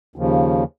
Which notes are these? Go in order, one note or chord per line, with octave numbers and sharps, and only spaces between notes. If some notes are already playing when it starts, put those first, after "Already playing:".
D#2 C#3 F3